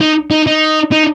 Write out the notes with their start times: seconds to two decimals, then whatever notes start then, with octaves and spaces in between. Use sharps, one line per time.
0.01 D#4
0.31 D#4
0.47 D#4
0.92 D#4